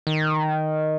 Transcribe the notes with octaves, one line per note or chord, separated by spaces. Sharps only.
D#3